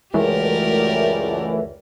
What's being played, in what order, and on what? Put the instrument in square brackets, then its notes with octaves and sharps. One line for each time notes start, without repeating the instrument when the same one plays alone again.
[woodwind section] C#2 F#2 [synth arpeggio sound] E3 A3 [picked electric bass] G#3 [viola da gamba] G4 A#4 D5